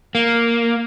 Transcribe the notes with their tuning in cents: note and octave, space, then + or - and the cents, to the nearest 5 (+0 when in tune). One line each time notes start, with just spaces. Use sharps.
A#3 +0